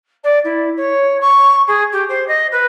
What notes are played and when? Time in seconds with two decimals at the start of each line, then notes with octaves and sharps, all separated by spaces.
0.23 D5
0.44 E4
0.76 C#5
1.20 C#6
1.67 G#4
1.92 G4
2.08 C5
2.28 D#5
2.51 B4